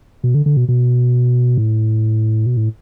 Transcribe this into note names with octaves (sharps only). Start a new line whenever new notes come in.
B2
D3
D3
B2
B2
A2
B2
A2